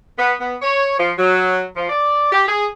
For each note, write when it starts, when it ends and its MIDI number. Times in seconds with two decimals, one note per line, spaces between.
0.18 0.33 59
0.40 0.56 59
0.62 0.97 73
0.98 1.12 53
1.18 1.64 54
1.76 1.87 53
1.89 2.32 74
2.32 2.45 67
2.48 2.66 68